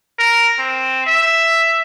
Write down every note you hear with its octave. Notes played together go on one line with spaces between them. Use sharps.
A#4
C4
E5